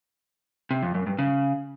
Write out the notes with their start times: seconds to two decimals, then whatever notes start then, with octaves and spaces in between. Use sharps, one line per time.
0.71 C3
0.83 F2
0.95 F#2
1.07 G2
1.19 C#3